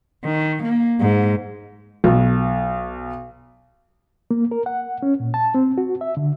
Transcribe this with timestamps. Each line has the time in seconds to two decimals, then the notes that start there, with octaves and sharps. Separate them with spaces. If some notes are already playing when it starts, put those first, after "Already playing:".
0.24 D#3
0.64 A#3
1.00 G#2
2.04 B1
4.31 A#3
4.51 A#4
4.66 F#5
5.03 C#4
5.20 A#2
5.34 A5
5.55 C4
5.78 F#4
6.01 E5
6.17 D3